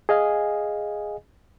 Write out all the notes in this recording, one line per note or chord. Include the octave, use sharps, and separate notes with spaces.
G#4 D#5 F5 G#5